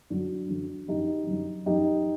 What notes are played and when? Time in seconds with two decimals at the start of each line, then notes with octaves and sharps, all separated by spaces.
0.10 F#2 D3 F#3 D4 F#4
0.49 F#2 D3 F#3
0.88 F#2 D3 F#3 D#4 G4
1.27 F#2 D3 F#3
1.66 F#2 F#3 D#4 G4